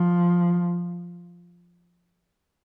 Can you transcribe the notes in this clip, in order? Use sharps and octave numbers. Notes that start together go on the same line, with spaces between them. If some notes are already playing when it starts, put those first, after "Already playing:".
Already playing: F3